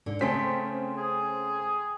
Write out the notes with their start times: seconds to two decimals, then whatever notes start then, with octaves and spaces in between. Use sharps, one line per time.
0.06 G#2 D3
0.21 C#3 A3 C4 C#5 G5 G#5 C6 B6
0.97 G#4